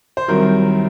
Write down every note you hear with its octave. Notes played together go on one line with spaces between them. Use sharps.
C5
C2 C3 D#3 F#3 A#4